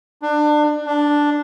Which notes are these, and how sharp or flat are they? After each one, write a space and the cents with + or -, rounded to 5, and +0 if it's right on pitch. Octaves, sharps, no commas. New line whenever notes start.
D4 +25
D4 +0